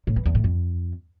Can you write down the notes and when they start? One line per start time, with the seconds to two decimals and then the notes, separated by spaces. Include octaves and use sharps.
0.07 A2
0.16 E3
0.26 E2
0.35 A2
0.44 F2